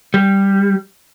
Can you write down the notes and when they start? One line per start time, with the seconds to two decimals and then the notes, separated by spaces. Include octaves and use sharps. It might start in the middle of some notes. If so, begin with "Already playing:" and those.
0.14 G3